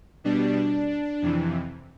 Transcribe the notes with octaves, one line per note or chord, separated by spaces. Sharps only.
B2 G3 D4
F2 C3 E3